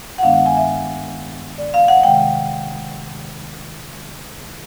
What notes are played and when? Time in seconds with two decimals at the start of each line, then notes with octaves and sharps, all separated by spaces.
0.18 F#5
0.23 G2 D#3 G#3 B3 D4 F5
0.34 F#5
0.46 G#5
0.57 E5
1.58 D5
1.74 F5
1.88 F#5
2.03 C3 D#3 G#3 G5